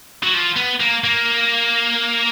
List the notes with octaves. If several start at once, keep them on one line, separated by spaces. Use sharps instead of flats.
F#3
F3
B3
A#3
A#3